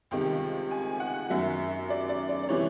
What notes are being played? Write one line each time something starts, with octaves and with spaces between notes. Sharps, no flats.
C#2 C3 D#3 G3 G5
G#5
F#5
F#2 D#3 F#3 E5
D5
D5
D5
D5
C3 E3 G3 C#5